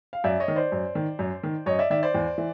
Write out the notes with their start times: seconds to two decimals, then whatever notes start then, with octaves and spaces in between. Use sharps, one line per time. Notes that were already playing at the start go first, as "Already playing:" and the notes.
0.13 F5
0.24 F#2 D5 E5
0.40 C#5 D#5
0.48 D#3
0.56 C5 D5
0.72 F#2
0.95 D#3
1.19 F#2
1.44 D#3
1.66 F#2 C#5 D#5
1.79 D5 E5
1.90 D#3 D5 E5
2.03 C5 D5
2.14 E2
2.38 E3